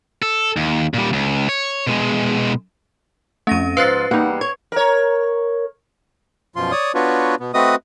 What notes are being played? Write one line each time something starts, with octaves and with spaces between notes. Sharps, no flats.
A4
D#2
A#2 G3
C#2
C#5
B2 G#3
F2 A3 C#4 A#6 D#7
G#2 F3 B4 F5 F#6 A6 C7
E2 G3 A#3 D#4 F#5
C#5 G#6
A#4 C#5
F#2 B2 F3 F4 C6
C#5 D5 D#6
B3 D4 F4 F#4 B4 C#5
B2 B3
A3 C4 F#4 B4 D#5 D#6